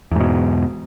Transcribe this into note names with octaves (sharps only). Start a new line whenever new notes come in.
E2 G#2 B2